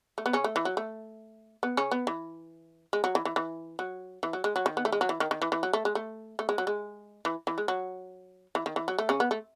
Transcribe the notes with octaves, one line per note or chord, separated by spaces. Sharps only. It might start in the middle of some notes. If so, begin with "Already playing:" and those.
A3
B3
C#3 C#4
A3
E3
F#3
A3
B3
C#3 C#4
B3
E3
G#3
F#3
E3
E3
E3
F#3
E3
F#3
G#3
F#3
D#3
B3
A3
G#3
F#3
E3
D#3
D#3
E3
E3
F#3
A3
G#3
A3
A3
G#3
F#3
G#3
E3
E3
G#3
F#3
E3
D#3
E3
F#3
A3
C#3 C#4
B3
A3